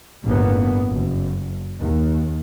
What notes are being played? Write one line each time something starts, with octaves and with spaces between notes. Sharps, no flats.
G1 E2 A2 C#3 A#3 B3
F#1
D#2